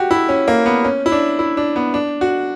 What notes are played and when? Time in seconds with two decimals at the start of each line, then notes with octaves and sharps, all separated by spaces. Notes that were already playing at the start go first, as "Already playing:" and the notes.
Already playing: F#4 G4
0.11 E4
0.29 C#4
0.48 A#3
0.66 B3
0.84 C#4
1.06 E4
1.12 D4
1.39 E4
1.57 D4
1.76 B3
1.94 D4
2.21 F#4